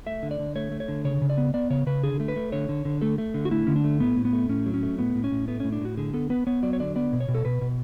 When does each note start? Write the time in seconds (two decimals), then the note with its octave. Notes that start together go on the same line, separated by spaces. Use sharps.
0.06 A3 E5
0.23 D3
0.31 D5
0.39 D3
0.56 A3 C#5
0.71 A3
0.80 C#5
0.88 D3
1.05 C#3 C#5
1.22 C#3
1.30 D5
1.38 B3
1.54 B3 D5
1.70 C#3 C#5
1.86 C#3 B4
2.03 D3 G#4
2.20 A3
2.28 B4
2.36 A3
2.52 D3 C#5
2.69 D3
2.85 D3
3.01 A3 A4
3.18 A3
3.34 D3
3.45 F#4
3.51 A3 E4
3.67 D3 C#4
3.76 D4
3.84 A3
4.00 A2 B3
4.17 A2
4.25 B3
4.33 A3
4.49 A2 C#4
4.66 F#3
4.74 C#4
4.83 A3
4.99 A2 B3
5.15 A2
5.24 C#4
5.32 A2
5.48 A3 B3
5.60 A2 C#4
5.72 D4
5.81 A2 F#4
5.97 D3 G#4
6.14 B3 A4
6.30 B3 B4
6.47 B3 C#5
6.63 F#3 D5
6.73 C#5
6.80 D3 D5
6.96 B3 D5
7.13 B2
7.20 C#5
7.28 B2
7.35 A4
7.45 B2 B4
7.61 B2